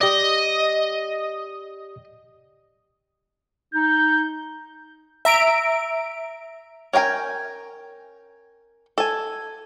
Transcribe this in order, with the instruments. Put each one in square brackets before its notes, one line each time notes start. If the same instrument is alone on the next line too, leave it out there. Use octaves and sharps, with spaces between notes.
[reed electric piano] G4 D5 [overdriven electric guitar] D#5
[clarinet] D#4 [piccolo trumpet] G6
[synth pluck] E5 A#5 D7
[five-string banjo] C#4 A#4 G5 G#5
A4 G#5